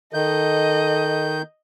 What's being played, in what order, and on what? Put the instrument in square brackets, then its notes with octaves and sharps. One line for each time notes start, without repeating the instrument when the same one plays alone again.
[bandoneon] D#3 G6 [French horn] A4 [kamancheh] D#5